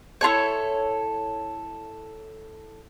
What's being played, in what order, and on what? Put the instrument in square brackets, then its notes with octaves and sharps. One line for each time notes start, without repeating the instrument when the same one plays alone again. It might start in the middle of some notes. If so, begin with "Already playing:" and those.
[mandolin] E4 F4 A4 C#5